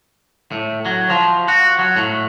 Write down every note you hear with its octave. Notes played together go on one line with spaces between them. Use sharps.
A2
F#3
F3
F#4
F#3
A2